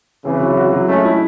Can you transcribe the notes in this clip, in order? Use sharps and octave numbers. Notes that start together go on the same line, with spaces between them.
C#3 E3 C4
F#3
F#4
F#3
G#3 A3 C#4
E4